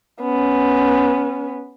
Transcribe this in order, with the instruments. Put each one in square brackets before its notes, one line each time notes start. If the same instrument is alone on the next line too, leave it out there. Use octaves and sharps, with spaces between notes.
[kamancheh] B3 C#4